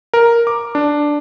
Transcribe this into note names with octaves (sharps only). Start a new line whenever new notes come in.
A#4
D6
D4